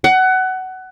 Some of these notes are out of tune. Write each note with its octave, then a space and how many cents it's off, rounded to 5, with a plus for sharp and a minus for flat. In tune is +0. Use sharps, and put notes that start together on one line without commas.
F#5 +20